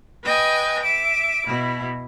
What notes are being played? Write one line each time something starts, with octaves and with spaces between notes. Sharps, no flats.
B4 D#5 G5 G#5
E5 D6
B2 E4